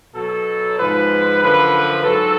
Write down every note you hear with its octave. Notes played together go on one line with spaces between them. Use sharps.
B2 F#3 A4
G#2 F3 B4
F#2 D3 F3 B4
G#2 F#3 A4